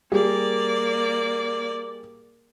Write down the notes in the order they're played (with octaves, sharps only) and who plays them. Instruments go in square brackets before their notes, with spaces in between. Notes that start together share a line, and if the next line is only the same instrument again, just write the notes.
[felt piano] G3 G#4 [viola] A#3 D5